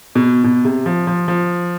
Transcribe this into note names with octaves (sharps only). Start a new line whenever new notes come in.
B2
B2
C3
F3
F3
F3